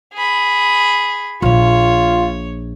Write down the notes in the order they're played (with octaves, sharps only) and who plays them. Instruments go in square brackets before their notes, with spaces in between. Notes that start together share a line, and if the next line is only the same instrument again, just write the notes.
[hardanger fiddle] G#4 B5
[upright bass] A#1 A#2 [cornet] F4 [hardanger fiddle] C#5